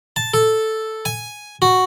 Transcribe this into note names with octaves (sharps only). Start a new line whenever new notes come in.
A5
A4
G#5
F#4